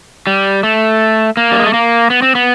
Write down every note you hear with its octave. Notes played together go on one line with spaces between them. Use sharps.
G3
A3
A#3
G3
G#3
A3
A#3
B3
C4
B3